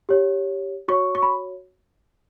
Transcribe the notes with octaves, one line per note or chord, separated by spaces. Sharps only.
G4 C#5
F#4 C#5 C#6
C#6
B5